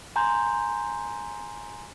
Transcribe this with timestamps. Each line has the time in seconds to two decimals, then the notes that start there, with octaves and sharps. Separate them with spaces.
0.16 G#5 A#5 C6 G6